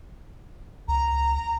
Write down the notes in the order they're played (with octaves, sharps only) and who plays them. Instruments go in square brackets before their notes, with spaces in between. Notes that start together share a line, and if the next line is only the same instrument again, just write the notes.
[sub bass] C#2 [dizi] A#5